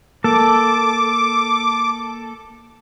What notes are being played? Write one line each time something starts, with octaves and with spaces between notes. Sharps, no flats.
A#3 A4 D6